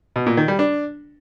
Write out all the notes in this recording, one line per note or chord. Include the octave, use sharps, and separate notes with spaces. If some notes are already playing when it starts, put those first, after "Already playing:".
B2
A#2
D#3
G3
D4